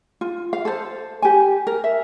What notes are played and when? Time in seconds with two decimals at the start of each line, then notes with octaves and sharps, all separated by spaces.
0.21 F4
0.53 F5
0.65 A4 C5
1.22 G4 G#5
1.67 A#4
1.84 E5